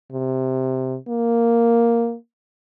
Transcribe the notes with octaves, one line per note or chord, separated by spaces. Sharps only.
C3
A#3